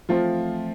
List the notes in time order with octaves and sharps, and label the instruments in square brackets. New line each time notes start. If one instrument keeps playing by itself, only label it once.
[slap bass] E3 A3 C4 [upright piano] F3 F4